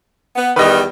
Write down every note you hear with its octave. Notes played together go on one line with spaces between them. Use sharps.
B3
E2 D#3 G3 B4 D#5